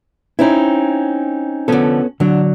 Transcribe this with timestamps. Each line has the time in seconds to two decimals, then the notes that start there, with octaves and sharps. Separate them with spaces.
0.39 C4 C#4 D#4 E4
1.68 D3 F3 B3 C#4 A4
2.20 D3 F#3 D4